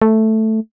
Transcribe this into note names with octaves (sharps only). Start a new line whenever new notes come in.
A3